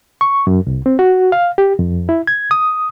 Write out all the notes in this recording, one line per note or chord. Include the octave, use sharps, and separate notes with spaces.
C#6
F#2
C2
C4
F#4
F5
G4
F2
E4
G#6
D#6